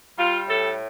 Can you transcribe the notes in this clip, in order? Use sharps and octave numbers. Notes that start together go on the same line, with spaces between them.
G3 F4
A2 A4